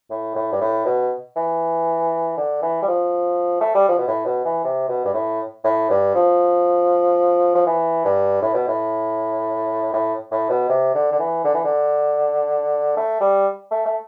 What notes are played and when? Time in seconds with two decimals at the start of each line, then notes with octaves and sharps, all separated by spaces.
0.10 A2
0.35 A2
0.52 G2
0.61 A2
0.85 B2
1.36 E3
2.37 D3
2.62 E3
2.82 G3
2.88 F3
3.61 A3
3.75 G3
3.89 F3
3.98 B2
4.08 A2
4.25 B2
4.45 E3
4.64 C3
4.89 B2
5.05 G2
5.14 A2
5.64 A2
5.90 G2
6.15 F3
7.55 F3
7.67 E3
8.05 G2
8.41 A2
8.54 B2
8.67 A2
9.93 A2
10.31 A2
10.50 B2
10.69 C3
10.95 D3
11.12 D3
11.19 E3
11.44 D3
11.54 E3
11.64 D3
12.96 A3
13.21 G3
13.71 A3
13.85 A3